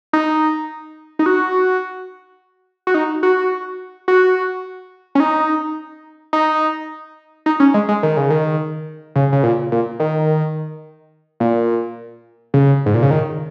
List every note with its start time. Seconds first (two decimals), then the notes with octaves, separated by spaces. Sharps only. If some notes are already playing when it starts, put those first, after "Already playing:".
0.13 D#4
1.19 D#4
1.26 F#4
2.87 F#4
2.94 D#4
3.23 F#4
4.08 F#4
5.15 C#4
5.20 D#4
6.33 D#4
7.46 D#4
7.60 C#4
7.74 G#3
7.89 G#3
8.03 D#3
8.17 C#3
8.30 D#3
9.16 C#3
9.32 C#3
9.43 A#2
9.72 A#2
10.00 D#3
11.40 A#2
12.54 C#3
12.86 G#2
12.94 A#2
13.02 C#3
13.11 D#3